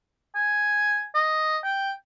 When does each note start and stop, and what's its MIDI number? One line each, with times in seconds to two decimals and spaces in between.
0.35 1.06 80
1.15 1.57 75
1.64 1.90 79